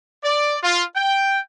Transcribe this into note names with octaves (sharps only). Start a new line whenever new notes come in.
D5
F4
G5